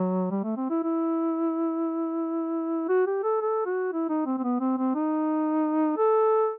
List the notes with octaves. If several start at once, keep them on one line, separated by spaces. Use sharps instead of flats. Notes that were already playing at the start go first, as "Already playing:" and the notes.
Already playing: F#3
G3
A3
C4
E4
E4
F#4
G4
A4
A4
F#4
E4
D#4
C4
C4
B3
C4
C4
D#4
A4